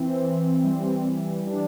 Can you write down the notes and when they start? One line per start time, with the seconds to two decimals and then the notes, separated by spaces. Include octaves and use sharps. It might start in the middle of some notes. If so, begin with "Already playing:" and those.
Already playing: E3 C4
0.23 E3
0.64 G3
1.05 E3
1.47 D4